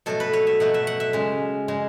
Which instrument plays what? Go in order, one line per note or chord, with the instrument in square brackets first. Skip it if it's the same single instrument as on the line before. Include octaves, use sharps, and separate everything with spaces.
[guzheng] B2 F#3 A3 A4
B4
C#5
E5
B2 F#3 A3 F#5
E5
F#5
E5
C#3 G#3
C#3 G#3